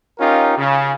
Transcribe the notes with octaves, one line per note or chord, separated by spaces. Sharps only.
C#4 D#4 F4 G4 A#4
C#3